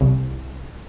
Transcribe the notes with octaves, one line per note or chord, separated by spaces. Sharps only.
C2